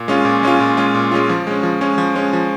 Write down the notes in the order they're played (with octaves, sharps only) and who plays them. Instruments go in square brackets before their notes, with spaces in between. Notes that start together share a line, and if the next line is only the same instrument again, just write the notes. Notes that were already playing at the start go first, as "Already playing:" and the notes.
Already playing: [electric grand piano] A#2
G#3 C#4 F4
A#2
G#3 C#4 F4
A#2
G#3 C#4 F4
A#2
G#3 C#4 F4
F3
G#3 C#4
F3
G#3 C#4
F3
G#3 C#4
F3